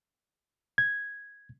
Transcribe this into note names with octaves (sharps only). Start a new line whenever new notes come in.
G#6